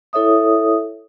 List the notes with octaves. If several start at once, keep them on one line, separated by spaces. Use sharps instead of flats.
E4 A4 C#5 E5 D#6